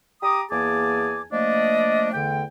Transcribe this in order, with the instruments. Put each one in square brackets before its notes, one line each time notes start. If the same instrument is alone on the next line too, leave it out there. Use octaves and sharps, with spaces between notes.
[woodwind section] G4 A#5 D6 D#6
E2 A#3 G#4 G#5 A5 D6
F3 A3 A#3 D4 D5 D#5
E2 D3 A3 G5